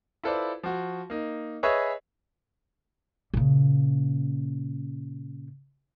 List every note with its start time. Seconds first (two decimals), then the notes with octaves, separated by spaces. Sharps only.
0.24 E4 F4 A4 B4 C5 D5
0.63 F3 F#4
1.10 A#3 D#4
1.63 G#4 B4 C#5 D#5 E5
3.34 A#2 C#3